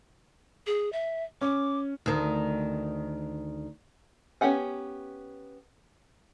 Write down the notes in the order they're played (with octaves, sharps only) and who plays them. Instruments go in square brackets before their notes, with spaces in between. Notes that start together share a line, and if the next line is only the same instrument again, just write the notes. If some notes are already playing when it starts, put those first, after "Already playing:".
[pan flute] G#4
E5
[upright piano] C#4 [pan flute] D6
[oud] D2 D#3
[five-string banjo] B3 C#4 G4 F#5 G#5